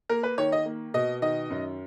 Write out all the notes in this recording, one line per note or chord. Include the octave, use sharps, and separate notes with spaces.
A#3 A#4
B4
D#3 C#5
D#5
A#3
B2 D#5
D#3 D#5
F#2